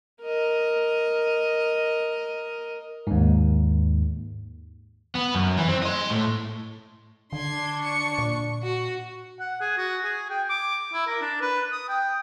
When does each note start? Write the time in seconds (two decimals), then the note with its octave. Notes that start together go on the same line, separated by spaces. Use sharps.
0.22 A#4 D#5
3.07 D#2 G#2
5.15 B3
5.34 F#2
5.57 E3
5.69 C4
5.83 D#5 C6
6.11 A2
7.33 D3 D4 C6 G#6
7.80 C#6 C#7
8.18 A#2
8.62 F#4
9.40 F#5
9.61 G#4
9.77 F#4
10.04 G#4
10.30 G5
10.50 D6
10.93 E4
11.07 A#4
11.21 D4
11.41 B4
11.72 D#6
11.89 G5